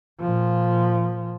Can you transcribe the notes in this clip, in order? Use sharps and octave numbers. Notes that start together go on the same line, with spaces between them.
A#2 F3